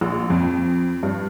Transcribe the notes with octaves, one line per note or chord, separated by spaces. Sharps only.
A#1
F2
G2